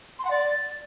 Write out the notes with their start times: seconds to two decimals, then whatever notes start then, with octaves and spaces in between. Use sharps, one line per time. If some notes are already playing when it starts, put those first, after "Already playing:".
0.19 C6
0.25 F#5
0.30 D5